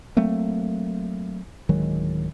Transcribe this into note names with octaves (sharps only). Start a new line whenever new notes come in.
F#3 A3 A#3 C4
D1 D#3 F#3 G#3